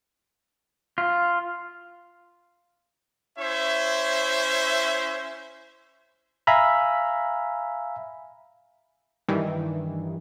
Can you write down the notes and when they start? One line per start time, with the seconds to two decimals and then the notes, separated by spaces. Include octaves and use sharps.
0.98 F4
3.38 C#4 E4 C5 C#5 E5
6.47 E5 F5 G#5 A#5 B5
9.28 G2 D#3 E3